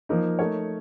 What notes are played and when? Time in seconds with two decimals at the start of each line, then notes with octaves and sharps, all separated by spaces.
0.09 F3 A#3 D#4
0.39 A3 D#4 A#4 C#5